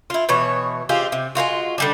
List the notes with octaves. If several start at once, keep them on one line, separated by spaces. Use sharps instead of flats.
E4 F4
B2 E3 C#5
G#3 C4 F4 G4
C3
G#3 A#3 F4 F#4
D3 G3 D4